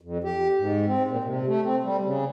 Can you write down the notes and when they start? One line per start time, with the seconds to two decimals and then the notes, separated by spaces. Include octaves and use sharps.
0.01 F2
0.24 G4
0.58 G#2
0.86 C4
1.08 A#2
1.24 C3
1.46 A3
1.63 C4
1.83 G3
2.04 C#3